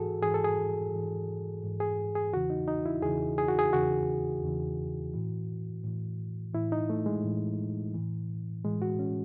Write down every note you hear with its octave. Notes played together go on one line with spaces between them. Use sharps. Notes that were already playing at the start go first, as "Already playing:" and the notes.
Already playing: G#2 E3 F#4 G#4 A4
G#2 E3 G#4
A4
G#4
G#2 E3
G#2 E3
G#4
G#4
E2 C#3 E3 F#4
D#4
D#4
E4
E2 C#3 E3 G#4
G#4
F#4
G#4
E2 C#3 E3 F#4
E2 C#3 E3
A2 E3
A2 E3
A2 E3 E4
D#4
A3
G#3
A2 E3
A2 E3
A2 E3 G#3
F#4
C#4